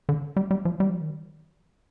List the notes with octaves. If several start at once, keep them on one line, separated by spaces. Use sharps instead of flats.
D3
G3
G3
F3
G3
F3
D#3